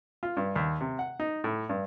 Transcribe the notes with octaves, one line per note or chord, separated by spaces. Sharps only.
F4
G2
D#2
C3
F#5
D#4
A2
G2